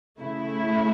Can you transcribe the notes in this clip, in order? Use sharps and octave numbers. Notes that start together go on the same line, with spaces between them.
C#3 A3 E4